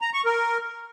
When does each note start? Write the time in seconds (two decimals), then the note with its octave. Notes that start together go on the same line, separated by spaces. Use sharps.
0.02 A#5
0.13 C#6
0.25 A#4